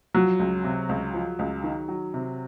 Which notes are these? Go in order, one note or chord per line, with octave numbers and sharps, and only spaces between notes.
F3 F#3
C#2
C3
C#2
F3
C#2
D#3
F#3
C3